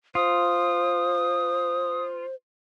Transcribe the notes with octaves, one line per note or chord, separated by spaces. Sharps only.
F4 C5 D#6